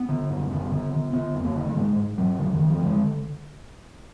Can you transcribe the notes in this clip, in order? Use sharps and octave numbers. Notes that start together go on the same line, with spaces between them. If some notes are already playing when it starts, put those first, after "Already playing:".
Already playing: B3
D3
F#2
D3 B3
D3
D3
D3 B3
F2
A#3
D3
A#3
G#2 G#3
G#2
G#2 F#3
F#2 D3
D#3
F#2
F3
D3
G#3